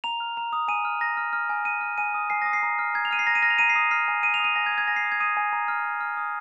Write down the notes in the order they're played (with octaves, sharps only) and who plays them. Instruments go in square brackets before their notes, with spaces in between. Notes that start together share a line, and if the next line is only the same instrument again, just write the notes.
[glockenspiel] A#5 F7
F6
A#5
D#6
G#5 D#7
F6
A#5 A#6
F6
F6
G#5
A#5 D#7
F6
G#5 D#7
D#6
G#5 C7
D#6 A#6
C7
A#5
F6
A#5 G#6
F7
F6 D#7
C7
A#5 A#6
D#7
F6 A#6
F7
A#5 D#7
C7
D#6
F6 C7
G#5
G#5 D#7
F7
D#6 D#7
G#5 A#6
G#6
D#6
G#6
G#5 A#6
C7
D#6
G#6
D#6 D#7
G#5
A#5
F6
A#5
F6
D#6